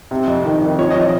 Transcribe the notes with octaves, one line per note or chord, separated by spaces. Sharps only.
C3
F2
D#3
F2
F3 C#5
D#5
F3
D#5